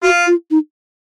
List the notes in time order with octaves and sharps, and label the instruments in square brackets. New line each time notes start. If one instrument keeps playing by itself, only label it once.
[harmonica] F4 [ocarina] F#4
[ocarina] F4
D#4